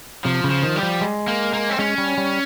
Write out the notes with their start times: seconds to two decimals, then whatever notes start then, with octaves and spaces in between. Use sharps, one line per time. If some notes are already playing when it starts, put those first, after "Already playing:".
0.25 C3 F3
0.44 C#3
0.50 F3
0.63 D#3
0.76 G3
0.83 F3
1.01 G#3
1.28 A#3
1.53 A#3
1.70 C4
1.79 G#3 C#4
1.98 G3
2.18 G3